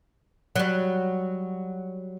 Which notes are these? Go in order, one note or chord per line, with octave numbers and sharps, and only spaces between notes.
F#3 G3